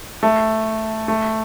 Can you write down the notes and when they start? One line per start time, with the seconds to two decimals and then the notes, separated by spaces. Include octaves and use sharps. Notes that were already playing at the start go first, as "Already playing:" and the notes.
0.23 A3
1.08 A3